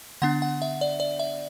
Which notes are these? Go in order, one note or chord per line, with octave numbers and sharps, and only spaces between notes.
D3 B3 D4 F#5
F#5
E5
D5
D5
E5